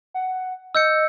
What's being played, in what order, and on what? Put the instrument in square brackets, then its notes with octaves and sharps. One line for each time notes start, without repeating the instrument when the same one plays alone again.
[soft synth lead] F#5
[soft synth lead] D#5 [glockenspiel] E6 G6 C#7